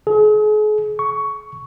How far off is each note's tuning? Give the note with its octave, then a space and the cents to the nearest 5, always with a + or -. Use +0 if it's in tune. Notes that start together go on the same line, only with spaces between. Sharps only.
G#4 +40
C#6 +10